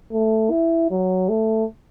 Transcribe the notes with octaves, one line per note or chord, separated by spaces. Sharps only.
A3
E4
F#3
A3